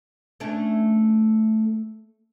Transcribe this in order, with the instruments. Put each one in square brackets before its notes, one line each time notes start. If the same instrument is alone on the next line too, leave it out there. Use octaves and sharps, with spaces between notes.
[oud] A3 C#4 D4